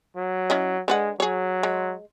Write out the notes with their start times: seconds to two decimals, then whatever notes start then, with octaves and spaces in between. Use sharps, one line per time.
0.17 F#3
0.50 C#4 E4 D#5
0.88 D3 G#3 B4 F#5
1.20 F#3 G#4 C#5
1.63 G#3